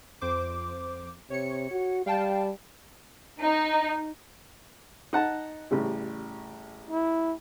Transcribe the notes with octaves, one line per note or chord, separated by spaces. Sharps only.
F2 C5 D6
C3 C#5 C#7
F#4
G3 F5 G5 A5
D#4
D#4 F#5 A5
A1 C#3 G3
E4